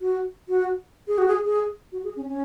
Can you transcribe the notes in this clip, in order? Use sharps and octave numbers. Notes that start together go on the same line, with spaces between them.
F#4
F#4
G#4
F#4
G#4
G#4
F#4
G#4
C#4
C#4